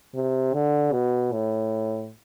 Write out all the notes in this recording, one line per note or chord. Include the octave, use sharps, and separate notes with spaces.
C3
D3
B2
A2